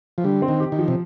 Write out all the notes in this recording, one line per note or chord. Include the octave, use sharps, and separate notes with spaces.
F3
D3 G3
C4
D#3
G4
D#3
F3
C3